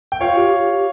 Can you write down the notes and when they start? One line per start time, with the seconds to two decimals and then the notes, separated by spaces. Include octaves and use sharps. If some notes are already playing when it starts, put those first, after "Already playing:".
0.12 G5
0.21 F4 C#5 F5
0.37 G4
0.68 G4